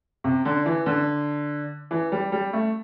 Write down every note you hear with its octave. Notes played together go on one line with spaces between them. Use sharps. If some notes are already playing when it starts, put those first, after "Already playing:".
C3
D3
E3
D3
E3
G3
G3
A3